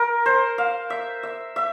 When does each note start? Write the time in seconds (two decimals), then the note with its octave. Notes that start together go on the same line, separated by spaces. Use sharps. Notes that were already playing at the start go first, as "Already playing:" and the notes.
Already playing: A#4
0.26 C5
0.58 F5
0.90 E5
1.23 E5
1.56 E5